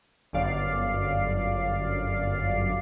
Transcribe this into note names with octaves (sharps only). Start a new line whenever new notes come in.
G1 F#2 D5 F5 C7